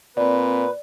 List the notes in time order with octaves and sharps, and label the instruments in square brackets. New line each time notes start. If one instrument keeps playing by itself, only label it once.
[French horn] A#2 [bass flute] C4 [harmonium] B4 [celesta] D5